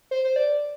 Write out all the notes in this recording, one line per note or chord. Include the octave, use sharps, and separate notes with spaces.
C5
C5
D5